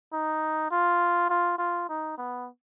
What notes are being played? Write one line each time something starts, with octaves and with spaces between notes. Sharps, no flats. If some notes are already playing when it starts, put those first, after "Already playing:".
D#4
F4
F4
F4
D#4
B3